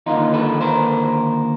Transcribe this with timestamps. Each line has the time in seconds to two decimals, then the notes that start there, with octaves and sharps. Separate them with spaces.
0.06 D#2 D3 F3 A#3 D#4 F4
0.34 A4 B4
0.61 A#4 C5